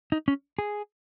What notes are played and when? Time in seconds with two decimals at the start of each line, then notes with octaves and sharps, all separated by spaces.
0.12 D#4
0.28 C#4
0.59 G#4